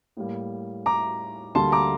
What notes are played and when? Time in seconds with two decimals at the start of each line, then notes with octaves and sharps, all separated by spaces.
0.17 A2 G3 A#3
0.86 A#5 D6
1.55 D2 D3 G3 A#3 A5 C6
1.72 A#5 D6